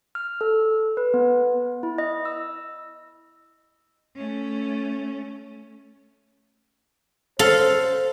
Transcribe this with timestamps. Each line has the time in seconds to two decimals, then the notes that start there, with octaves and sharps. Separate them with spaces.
0.15 F6
0.41 A4
0.97 B4
1.14 B3
1.83 E4
1.98 D#5
2.25 E6
4.16 A3 C#4
7.39 A4 C5 F5